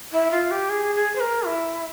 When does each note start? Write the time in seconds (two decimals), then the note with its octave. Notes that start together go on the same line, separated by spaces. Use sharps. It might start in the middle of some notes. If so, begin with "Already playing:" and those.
0.12 E4
0.31 F4
0.51 G4
0.69 G#4
0.95 G#4
1.15 C5
1.20 A#4
1.45 E4